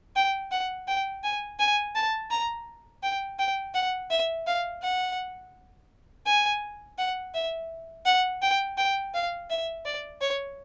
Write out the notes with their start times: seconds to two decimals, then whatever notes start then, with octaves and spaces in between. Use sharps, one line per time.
0.16 G5
0.51 F#5
0.88 G5
1.24 G#5
1.59 G#5
1.95 A5
2.31 A#5
3.03 G5
3.39 G5
3.74 F#5
4.10 E5
4.46 F5
4.82 F#5
6.26 G#5
6.98 F#5
7.34 E5
8.06 F#5
8.42 G5
8.78 G5
9.14 F5
9.50 E5
9.85 D5
10.21 C#5